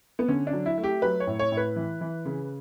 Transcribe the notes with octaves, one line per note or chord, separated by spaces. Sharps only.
B3
D3 C#4
D4
F#3
E4
A3
G4
F#3 B4
C#5
A2
C#5
A2
B4
E3
E3
C#3